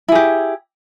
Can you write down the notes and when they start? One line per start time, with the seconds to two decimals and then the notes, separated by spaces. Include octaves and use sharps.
0.08 E4
0.12 G#4
0.15 G4